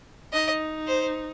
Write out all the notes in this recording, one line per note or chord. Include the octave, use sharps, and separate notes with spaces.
D#4 D#5
C5